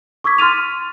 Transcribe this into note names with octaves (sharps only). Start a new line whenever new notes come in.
C#6 D6 E6 G#6 B6
C6 F6 A6 D#7 F7